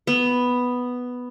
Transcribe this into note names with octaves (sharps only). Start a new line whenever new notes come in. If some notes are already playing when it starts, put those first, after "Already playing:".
B3